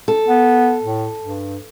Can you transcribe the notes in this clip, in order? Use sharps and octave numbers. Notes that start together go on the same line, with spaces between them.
A4
B3
A2
G2